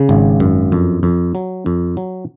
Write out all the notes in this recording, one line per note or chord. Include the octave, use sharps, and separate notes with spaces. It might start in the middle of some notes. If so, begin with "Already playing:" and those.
Already playing: C#3
G#1
F#2
F2
F2
F#3
F2
F#3